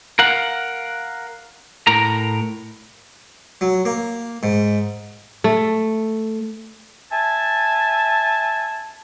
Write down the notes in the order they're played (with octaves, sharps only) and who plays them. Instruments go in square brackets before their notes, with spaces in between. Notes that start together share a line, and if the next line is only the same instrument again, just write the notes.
[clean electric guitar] A#4 F5 F#5
A2 A#4 A#5
[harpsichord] F#3
A#3
G#2
[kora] A3
[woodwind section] E5 G#5 A5